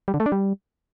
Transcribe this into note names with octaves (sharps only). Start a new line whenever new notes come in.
G3
D3
A3
D4
G3